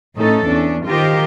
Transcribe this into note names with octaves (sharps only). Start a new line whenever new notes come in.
A2 E3 C#4 D#4 A4
E2 C#4 D4
D#3 F4 G4 A#4 C5